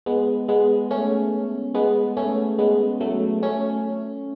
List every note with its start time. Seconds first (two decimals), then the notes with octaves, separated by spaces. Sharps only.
0.06 G#3 B3
0.48 G#3 B3
0.91 A3 C#4
1.75 G#3 B3
2.17 A3 C#4
2.59 G#3 B3
3.00 F#3 A3
3.43 A3 C#4